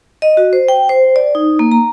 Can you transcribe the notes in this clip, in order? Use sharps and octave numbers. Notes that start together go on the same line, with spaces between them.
D#5
F#4
C5
G5
C5
D5
D#4
A#3
A#5